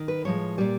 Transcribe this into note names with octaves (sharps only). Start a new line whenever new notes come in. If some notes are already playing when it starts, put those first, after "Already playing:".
Already playing: D#3
B4
A2 F3 G#3 C#5
A#2 G3 D5